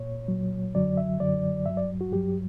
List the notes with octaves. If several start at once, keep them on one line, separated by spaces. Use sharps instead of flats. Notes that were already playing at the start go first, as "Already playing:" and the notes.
Already playing: A#2 C#5
A#2 F#3
F#2 D3 F#3 D5
E5
F#2 D3 F#3 D5
G2 F#3 E5
D5
F#4
G2 F#3 G4